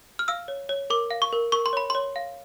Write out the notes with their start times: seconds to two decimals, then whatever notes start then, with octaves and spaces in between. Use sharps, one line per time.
0.19 F6
0.28 F5 E6
0.48 C#5
0.69 C#5
0.90 A#4 D6
1.11 F5
1.22 C#6
1.33 A#4
1.52 A#4 C#6
1.66 C6
1.73 C#5 B5
1.90 C#5 C6
2.16 F5